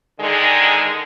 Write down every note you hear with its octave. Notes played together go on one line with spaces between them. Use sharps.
D3 D#3 G#3